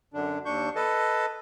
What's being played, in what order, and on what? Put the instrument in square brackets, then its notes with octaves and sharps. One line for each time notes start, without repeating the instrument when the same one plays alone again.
[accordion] F#2 D3 D4
D#2 D4 C#6 G6
A4 B4 D#5 A5